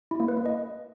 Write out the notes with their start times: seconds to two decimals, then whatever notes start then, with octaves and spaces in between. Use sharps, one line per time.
0.11 E4
0.20 A#3
0.28 B4
0.37 A#3
0.46 D#5